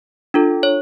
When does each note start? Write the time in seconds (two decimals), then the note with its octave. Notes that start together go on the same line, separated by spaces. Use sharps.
0.34 D4 F4 A4
0.63 C#5